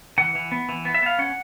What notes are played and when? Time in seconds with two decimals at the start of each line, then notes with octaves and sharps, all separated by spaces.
0.18 E3 F#5
0.35 E3
0.52 B3
0.69 E3
0.85 B3
0.94 E5
1.02 B3 F5
1.18 C#4 F#5